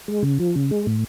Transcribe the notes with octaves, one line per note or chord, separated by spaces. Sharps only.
G#3
C#3
F3
C#3
G#3
A2